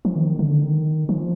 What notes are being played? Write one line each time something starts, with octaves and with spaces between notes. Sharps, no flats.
F3
D#3
D3
D#3
F3